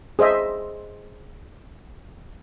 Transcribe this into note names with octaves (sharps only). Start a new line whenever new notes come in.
G#4 C5 D#5 E5